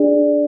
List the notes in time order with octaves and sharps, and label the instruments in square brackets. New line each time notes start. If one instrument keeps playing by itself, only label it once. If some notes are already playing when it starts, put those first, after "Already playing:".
Already playing: [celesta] D4 G#4 D5